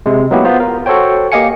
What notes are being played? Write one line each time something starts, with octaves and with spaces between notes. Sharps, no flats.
C3 G#3
F#3 A#3 B3 E4 G4
B3 F4 C5
A#4
F#4 A4 C5 C#5 G5
A#3 G4 D#5 F5 G#5 C#7